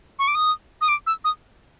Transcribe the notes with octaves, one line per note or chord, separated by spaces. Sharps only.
C#6
D6
D#6
D#6
D6
E6
D#6